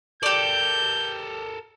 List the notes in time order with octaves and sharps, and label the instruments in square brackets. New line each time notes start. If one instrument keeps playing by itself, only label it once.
[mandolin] G4 D5 [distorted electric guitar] A4 A#4 [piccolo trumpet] G6